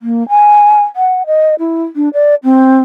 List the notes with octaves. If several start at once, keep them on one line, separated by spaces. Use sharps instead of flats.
A#3
G#5
F#5
D#5
E4
D4
D5
C4